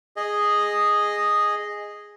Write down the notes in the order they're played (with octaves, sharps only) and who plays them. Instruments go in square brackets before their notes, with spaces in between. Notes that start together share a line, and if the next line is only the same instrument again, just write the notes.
[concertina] G#4 D#5